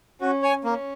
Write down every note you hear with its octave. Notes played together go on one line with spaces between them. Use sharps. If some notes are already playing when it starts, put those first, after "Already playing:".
C#4 F#4
C#5 G#5
A#3 C#4